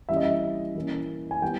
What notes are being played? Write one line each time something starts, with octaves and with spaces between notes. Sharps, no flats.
E3 G3 C#4 E5
D#5
E5
E3 A#3 C#4
G#5
E3 G3 B3 G5